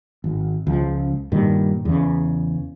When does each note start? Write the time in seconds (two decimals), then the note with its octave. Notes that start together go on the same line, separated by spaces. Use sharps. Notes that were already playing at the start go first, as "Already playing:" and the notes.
0.24 G#1
0.67 C#2 F3
1.32 G2 A#2 D#3
1.85 E2 C#3